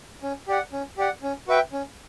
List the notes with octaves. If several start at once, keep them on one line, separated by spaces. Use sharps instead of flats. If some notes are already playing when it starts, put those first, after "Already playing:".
C#4
G4 D5 F#5
C#4
G4 D5 F#5
C#4
F#4 B4 E5 G5
C#4